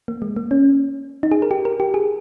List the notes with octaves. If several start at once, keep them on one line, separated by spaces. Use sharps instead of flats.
A#3
G#3
A#3
C#4
D#4
G#4
A#4
G4
A#4
G4
G#4